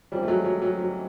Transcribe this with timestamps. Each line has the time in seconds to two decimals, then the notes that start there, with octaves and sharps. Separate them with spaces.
0.12 G#1 G#2 E3 F3 G3
0.23 A3
0.28 F#3 G#3
0.45 F#3
0.62 F#3
0.79 F#3